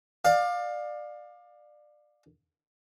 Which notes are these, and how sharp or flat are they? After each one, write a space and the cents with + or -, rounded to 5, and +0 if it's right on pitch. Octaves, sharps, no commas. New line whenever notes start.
D5 +25 F5 +20